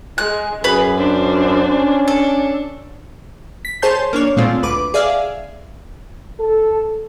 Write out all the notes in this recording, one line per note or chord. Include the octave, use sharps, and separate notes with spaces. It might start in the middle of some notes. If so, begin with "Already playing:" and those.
G#3 F#6
F#2 G#4 B4 B5
D4 C5
C#4
D4 A4
B6
G#4 C5 C#5 A5 C6 G6
A#3 D4 C#5
A#2 G#3 A3 C4 F4
D2 B4 D6
G#4 D5 E5 F5
A4